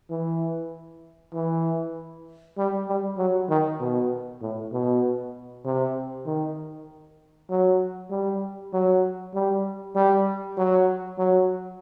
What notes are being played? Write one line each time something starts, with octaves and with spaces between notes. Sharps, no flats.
E3
E3
G3
G3
F#3
D#3
B2
A2
B2
C3
D#3
F#3
G3
F#3
G3
G3
F#3
F#3